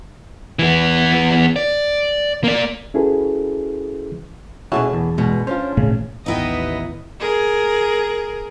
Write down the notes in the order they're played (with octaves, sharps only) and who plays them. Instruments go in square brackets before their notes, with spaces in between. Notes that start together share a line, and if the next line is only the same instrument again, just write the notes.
[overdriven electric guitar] E3 B3
D5
A#3 D5
[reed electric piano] C#4 E4 F#4 G#4 A4 B4
[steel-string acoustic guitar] B2 G#4 A5 [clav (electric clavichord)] C#4 E4 F#4
[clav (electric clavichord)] E2
[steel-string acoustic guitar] G2 B2 G#3
[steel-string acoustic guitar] C#4 D4 [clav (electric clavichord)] F4 C5
[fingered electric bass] G#1 A#2 A3 [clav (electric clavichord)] C#3
[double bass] A1 D#2 [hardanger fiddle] B3 D#5 [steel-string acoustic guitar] D#4 E4 G5 [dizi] B4
[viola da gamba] G#4 A#4